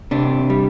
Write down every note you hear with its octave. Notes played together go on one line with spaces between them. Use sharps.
C3 D4
G3